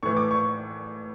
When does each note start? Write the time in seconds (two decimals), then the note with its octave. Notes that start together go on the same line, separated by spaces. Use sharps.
0.03 A2 E3 C#6
0.17 D6
0.31 C#6